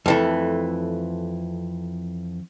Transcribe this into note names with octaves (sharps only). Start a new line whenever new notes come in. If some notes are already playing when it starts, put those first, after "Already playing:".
F2 E3 A3